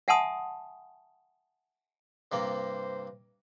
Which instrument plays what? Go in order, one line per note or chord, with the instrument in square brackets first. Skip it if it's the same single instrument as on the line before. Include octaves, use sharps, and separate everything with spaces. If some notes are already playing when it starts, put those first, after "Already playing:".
[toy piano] E5 F#5 G#5 A5 C6 D#6
[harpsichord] G2 C3 A#3 [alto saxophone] C5